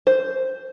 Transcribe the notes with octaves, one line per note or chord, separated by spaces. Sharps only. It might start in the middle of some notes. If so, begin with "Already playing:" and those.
C5